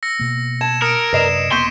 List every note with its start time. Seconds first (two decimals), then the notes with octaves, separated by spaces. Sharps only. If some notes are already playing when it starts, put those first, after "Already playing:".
0.03 E6 A#6 C#7
0.19 B2 A#3
0.61 A5 G#6 E7
0.82 A#4 D#6 C#7 D7
1.13 F#2 C3 B4 D5 D#5 G#6 C7 E7
1.52 E1 A#3 B3 C6 C#6 G6 B6 D#7